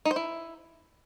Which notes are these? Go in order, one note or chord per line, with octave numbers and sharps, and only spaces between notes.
D#4
C5
E4